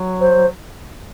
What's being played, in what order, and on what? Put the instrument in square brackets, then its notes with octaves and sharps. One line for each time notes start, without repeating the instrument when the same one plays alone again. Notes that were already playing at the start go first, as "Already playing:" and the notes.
Already playing: [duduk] F#3
[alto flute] C5